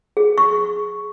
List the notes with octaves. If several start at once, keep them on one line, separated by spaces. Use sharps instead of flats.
G#4
C#6